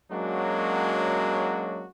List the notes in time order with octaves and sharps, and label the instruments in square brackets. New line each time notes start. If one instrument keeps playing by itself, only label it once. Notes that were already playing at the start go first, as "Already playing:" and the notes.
[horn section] F#3 G#3 A#3 C#4 D4 F#4